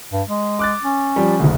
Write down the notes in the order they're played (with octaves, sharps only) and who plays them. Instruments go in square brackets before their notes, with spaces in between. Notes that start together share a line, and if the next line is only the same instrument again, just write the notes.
[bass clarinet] G2
G#3
[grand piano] D6 F#6 A6
[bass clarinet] C#4
[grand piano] F3 G3
F#1 D2